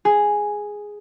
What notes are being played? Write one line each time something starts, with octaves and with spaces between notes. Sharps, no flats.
G#4